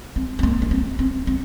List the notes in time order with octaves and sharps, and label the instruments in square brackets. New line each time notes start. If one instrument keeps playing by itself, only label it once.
[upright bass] C4
C4
A#3
D4
C4
C4
C4